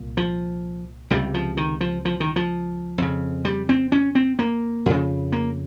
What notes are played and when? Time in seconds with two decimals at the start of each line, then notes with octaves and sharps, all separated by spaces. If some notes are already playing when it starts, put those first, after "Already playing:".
Already playing: C2 A#2
0.17 F3
1.10 C#2 C3 G3
1.34 F3
1.57 D#3
1.81 F3
2.05 F3
2.20 D#3
2.36 F3
2.98 F2 C#3
3.45 G3
3.69 C4
3.92 C#4
4.15 C4
4.39 A#3
4.86 F2 C#3
5.32 A#3